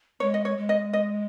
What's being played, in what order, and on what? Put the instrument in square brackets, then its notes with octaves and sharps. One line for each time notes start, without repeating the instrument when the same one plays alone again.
[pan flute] G#3 [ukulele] C#5
[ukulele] D#5
C#5
[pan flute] G#3
[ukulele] D#5
D#5